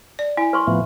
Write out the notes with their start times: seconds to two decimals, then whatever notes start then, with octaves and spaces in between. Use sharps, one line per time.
0.19 D5
0.37 E4 G#5
0.53 B4 C6 C#6
0.67 A2 F3 B3 E5